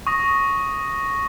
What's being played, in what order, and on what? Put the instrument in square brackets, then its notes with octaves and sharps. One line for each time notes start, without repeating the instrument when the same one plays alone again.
[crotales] C#6 D#6 A#6